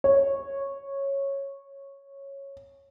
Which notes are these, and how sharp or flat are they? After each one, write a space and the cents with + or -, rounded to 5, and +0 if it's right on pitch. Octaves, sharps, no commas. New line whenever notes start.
C#5 -10